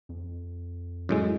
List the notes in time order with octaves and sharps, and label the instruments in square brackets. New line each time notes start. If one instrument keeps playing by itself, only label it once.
[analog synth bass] F2
[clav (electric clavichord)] F#2 A2 G#3